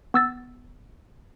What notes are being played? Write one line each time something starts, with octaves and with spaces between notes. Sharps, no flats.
B3 E6 A6